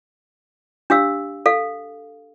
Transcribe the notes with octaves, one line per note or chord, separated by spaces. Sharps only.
D4 G4 F5 E6
A4 F5